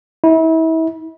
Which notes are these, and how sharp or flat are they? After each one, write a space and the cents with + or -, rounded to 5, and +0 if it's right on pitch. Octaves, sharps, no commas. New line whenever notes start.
E4 -35